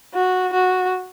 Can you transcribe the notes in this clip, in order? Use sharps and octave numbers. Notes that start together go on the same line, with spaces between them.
F#4
F#4